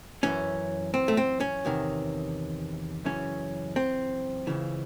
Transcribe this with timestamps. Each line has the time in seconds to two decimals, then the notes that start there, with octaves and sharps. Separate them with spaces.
0.23 F#2 E3 C#4
0.94 C4
1.08 A3
1.17 C4
1.40 C#4
1.65 E2 C3 D#3
3.04 F#2 C#3 E3 C#4
3.76 C4
4.47 C#2 C#3 E3